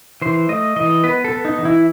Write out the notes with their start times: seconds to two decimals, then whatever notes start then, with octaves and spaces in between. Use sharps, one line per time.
0.22 E3 C5
0.49 A3 D#5
0.76 E3 D#5
1.04 B3 B4
1.25 A4
1.31 B3
1.45 D#4
1.58 E3
1.65 E4